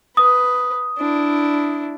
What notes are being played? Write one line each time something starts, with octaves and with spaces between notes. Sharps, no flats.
B4 D#6
D4 E4